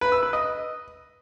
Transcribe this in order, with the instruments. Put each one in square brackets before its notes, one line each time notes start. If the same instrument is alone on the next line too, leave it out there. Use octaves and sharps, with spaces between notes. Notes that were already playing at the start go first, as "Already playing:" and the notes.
[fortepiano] B4
E6
B4
D#5